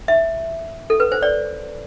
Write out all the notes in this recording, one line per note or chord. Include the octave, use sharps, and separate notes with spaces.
E5
A4
B4
C5
D5